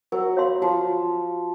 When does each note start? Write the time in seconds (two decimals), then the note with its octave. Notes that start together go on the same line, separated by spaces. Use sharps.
0.12 F#3 A#4
0.37 C#5 F5 C6
0.62 F3 F#4